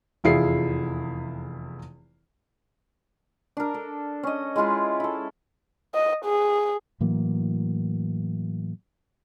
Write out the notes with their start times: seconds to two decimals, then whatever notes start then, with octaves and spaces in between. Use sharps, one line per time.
0.24 F1 E2 E4 F4 G#4 C7
3.57 D4 A#4
3.74 A4
4.23 C#4 D#5
4.56 G#3 E4 F4 G#4
5.00 E4 A4
5.94 D#5
6.25 G#4
7.00 A2 E3 F#3 A#3